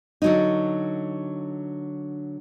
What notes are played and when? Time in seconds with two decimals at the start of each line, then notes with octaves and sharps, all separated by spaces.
0.22 D3 F#3 D#4